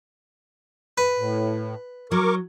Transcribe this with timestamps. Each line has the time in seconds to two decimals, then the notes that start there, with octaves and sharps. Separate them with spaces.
0.98 B4
1.18 A2
2.11 F#3 A#4 C#6 D6